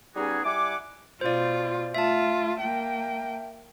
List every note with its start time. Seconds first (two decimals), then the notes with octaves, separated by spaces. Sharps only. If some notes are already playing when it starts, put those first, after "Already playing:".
0.16 G3 B3 C#4 D#4 F#4 G#4
0.45 G3 E4 F#5 G#5 D6
1.21 B2 F4 C5 D5
1.95 A3 F4 E5 A5
2.61 A#3 G5